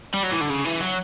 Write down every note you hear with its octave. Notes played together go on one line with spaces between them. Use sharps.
G3
F#3
E3
D3
C#3
E3
F#3